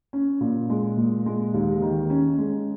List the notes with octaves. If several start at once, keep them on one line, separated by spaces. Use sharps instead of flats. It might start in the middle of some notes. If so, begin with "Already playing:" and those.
C#4
A#2
G#3
A#2
G#3
D#2
D#3
C#4
G#3